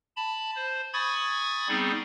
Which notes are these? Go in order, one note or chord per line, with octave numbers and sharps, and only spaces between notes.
A5 B5
C5
G#5 B5 C#6 D#6 G#6 A6
G3 B3 C4 D#4 G#4